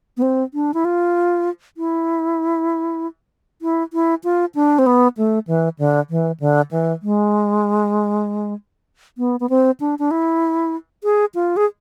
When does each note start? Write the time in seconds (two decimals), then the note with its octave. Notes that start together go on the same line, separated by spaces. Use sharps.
0.17 B3
0.22 C4
0.54 D4
0.74 E4
0.85 F4
1.77 E4
3.62 E4
3.93 E4
4.24 F4
4.55 D4
4.79 C4
4.86 B3
5.17 A3
5.47 E3
5.79 D3
6.10 E3
6.40 D3
6.71 E3
7.02 G#3
9.18 B3
9.40 B3
9.49 C4
9.80 D4
9.99 D4
10.11 E4
11.04 G#4
11.35 F4
11.57 G#4